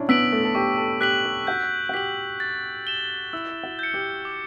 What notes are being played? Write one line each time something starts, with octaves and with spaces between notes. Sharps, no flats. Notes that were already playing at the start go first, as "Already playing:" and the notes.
Already playing: C#4 D4 E4
B3 E6 B6 D7 F#7
A3
A4
G4 C#6
A4
G4 F#6 B6 F#7
G4
F#4 G6
F#4
G4 B6 F#7
A6
E7 G7
E4 E6
F#4
G6 C#7
G4
D6